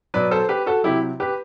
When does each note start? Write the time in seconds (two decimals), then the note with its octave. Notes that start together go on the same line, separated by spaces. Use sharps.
0.14 B2 F#3 B4 D5
0.31 A4 C5
0.49 G4 B4
0.66 F#4 A4
0.83 C3 F#3 E4 G4
1.20 G4 B4